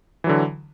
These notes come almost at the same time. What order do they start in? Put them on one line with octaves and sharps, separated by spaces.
E3 F#3 D3